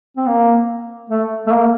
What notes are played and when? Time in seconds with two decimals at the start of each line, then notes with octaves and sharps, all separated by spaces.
0.17 C4
0.26 A#3
1.10 A3
1.47 A3
1.52 A#3